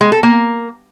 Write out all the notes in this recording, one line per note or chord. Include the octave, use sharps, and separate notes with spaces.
G#3
A4
A#3